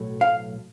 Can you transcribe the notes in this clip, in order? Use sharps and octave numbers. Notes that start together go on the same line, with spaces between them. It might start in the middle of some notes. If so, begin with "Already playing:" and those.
Already playing: B1 A2 F#3 A3
F5